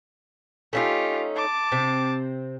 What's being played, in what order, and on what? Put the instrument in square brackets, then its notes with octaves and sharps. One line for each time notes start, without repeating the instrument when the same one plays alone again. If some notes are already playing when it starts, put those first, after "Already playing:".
[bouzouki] A3 C#4 D#4 [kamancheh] F4 G4
[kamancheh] A5 D6
[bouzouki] C3 C4